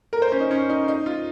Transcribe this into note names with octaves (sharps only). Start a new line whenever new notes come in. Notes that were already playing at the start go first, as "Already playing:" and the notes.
A#4
C5
C#4
D#4
C#4
D#4
D#4
F4